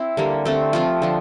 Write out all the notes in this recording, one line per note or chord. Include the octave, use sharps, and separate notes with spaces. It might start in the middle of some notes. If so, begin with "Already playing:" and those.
Already playing: C4 E4
D3 G3 A#3
D3 A3 C4
F3 C4 F4
D3 F3